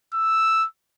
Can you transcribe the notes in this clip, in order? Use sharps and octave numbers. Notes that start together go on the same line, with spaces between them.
E6